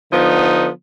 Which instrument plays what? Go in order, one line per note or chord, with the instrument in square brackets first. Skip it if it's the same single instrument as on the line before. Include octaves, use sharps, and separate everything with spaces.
[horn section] D3 F3 B3 D#4